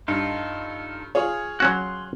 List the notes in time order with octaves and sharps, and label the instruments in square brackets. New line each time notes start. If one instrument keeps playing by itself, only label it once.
[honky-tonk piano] G2 [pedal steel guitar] D#4 F4 A4
[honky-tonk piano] F4 G#4 C#5
[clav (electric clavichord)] F#3 C#4 F#4 [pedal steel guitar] C6 F#6